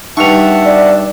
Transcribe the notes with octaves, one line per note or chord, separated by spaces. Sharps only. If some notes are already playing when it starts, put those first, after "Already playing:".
G2 D#4 E5 F#5 A5 C#6 C#7 F7
D5